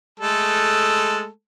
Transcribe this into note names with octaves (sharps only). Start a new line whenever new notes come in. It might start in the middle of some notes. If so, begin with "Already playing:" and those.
G#3 A3 A4